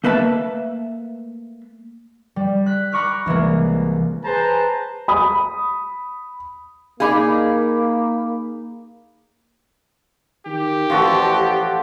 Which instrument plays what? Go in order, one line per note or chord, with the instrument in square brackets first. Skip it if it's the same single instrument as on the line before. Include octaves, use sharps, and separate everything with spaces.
[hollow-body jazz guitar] A3 A#3 B4 E5 A5
[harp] G3
F#6 B6
A#5 B5 C#6 D6 F6 F#6
C2 E3 G#3 A#3
[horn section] G#4 B4 C5 A5 A#5
[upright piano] B5 D#6
[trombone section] A#3 [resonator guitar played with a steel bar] D#4 G#4 [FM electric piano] F5 B5 D6
[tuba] D#3 [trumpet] G4
[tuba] A1 [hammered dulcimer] F3 F#4 A4